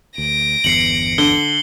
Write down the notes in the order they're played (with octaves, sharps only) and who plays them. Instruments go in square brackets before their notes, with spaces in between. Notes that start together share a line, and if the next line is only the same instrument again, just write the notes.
[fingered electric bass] D2 [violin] A#6 D7
[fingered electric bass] G1 E2 [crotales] C7 C#7 F#7
[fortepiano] D3 [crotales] G7